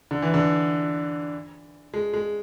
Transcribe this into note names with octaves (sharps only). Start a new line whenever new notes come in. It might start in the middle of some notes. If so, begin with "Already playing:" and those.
D3
E3
D3
G#3
G#3